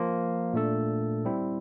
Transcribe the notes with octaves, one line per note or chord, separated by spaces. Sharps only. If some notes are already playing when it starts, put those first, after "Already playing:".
Already playing: F3 A#3 F4
A#2 A3 D4 A4
G3 C4 E4